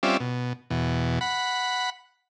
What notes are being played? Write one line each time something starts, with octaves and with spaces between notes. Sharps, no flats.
G3 C4 C#4 F4 D5 E5
B2
E2 B2
F#5 B5